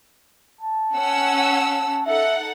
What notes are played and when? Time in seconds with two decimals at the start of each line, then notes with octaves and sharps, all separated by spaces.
0.61 A5
0.95 C#4 F#5 E6
2.06 D#4 A4 E5 F#5